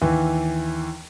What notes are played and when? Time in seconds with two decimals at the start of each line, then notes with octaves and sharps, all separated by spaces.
0.02 D#2 E3